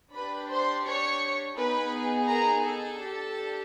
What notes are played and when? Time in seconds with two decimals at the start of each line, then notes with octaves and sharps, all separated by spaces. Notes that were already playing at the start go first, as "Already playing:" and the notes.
0.14 D4 G4 B4 B5
0.50 C5 C6
0.86 C#5 C#6
1.58 B3 D#4 G#4 B4 B5
2.29 A#4 A#5
2.65 A4 A5
3.01 D4 G4